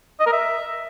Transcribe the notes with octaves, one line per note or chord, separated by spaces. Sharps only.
D#5
A#4
E5